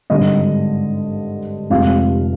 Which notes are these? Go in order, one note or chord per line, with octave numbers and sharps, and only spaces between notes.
G#1 G2 D3 G#3 D#5
F1 F2 C3 F3 G#3 F5